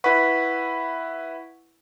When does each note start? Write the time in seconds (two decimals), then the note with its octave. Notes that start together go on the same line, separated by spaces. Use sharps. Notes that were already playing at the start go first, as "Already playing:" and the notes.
0.04 E4 B4 F#5 C#6 B6